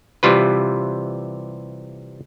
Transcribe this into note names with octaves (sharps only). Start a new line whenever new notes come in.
C3 E3 G3 F4 B4